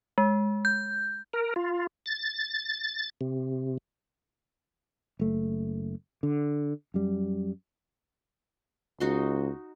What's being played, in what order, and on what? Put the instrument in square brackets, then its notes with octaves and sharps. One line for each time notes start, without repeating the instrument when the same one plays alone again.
[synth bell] G#3
G6
[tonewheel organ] A#4
F4
A6
C3
[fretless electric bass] F#1 A3
D3
F#2 G3
[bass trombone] C#2 [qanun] D#4 F#4 C6